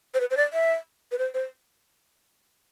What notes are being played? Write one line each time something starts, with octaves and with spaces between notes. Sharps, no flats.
C5
B4
C5
D5
E5
B4
C5
C5